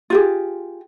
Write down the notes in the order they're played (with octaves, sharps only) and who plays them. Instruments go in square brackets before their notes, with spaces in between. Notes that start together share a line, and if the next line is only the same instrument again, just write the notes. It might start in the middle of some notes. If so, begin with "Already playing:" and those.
[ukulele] F4 G4 G#4